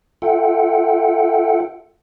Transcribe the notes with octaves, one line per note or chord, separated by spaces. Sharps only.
F4 A4 E5 F#5 G5